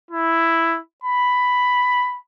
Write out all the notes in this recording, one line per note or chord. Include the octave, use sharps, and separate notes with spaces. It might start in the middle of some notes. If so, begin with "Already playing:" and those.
E4
B5